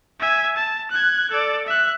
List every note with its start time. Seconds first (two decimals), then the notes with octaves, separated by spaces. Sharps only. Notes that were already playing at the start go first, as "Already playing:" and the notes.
0.20 E5 G#5
0.56 A5
0.91 F#6 G#6
1.31 A4 D5
1.67 E5 F#6